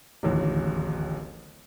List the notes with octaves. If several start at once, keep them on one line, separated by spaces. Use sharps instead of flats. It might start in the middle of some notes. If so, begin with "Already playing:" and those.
D1 A1 D#2